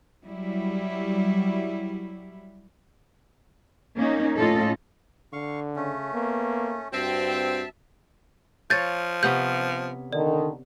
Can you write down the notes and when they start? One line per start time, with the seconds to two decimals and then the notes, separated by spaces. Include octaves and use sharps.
0.25 F#3 G3 E4
3.97 A#3 C#4 D#4
4.37 A2 C#4 F4 A4 D#5
5.33 D3 F5 C#6
5.76 C#3 A3 C#4
6.14 A#3 B3
6.93 G2 C4 F#4 E5 A5
8.70 F3 C#5 F5 G6 A6 D#7
9.23 C3 B3 C#4 G6
10.13 D3 D#3 D5